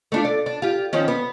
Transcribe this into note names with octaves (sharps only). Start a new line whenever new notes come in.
A3 D4 F4
D5
D4
F4 G4
D#3 F3 C#4
B3